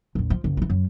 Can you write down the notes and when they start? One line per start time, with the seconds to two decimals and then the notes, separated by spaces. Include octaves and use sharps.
0.15 A#1 E2
0.30 F3
0.44 F#1
0.57 E3 G3
0.70 F#2